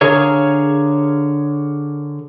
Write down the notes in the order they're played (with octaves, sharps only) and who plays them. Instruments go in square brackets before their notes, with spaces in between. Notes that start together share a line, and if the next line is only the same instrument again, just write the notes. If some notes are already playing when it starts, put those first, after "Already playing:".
[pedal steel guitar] D3 G#4 A#4 C#5 F5